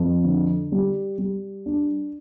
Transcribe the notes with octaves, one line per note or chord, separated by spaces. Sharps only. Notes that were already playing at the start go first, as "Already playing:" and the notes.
Already playing: F2
D3
G3
G3
D4